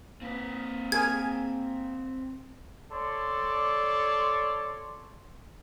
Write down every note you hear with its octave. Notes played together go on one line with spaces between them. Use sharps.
A#3 C4 B4
G#4 A#4 G#5 G#6
A4 C#5 D5 C6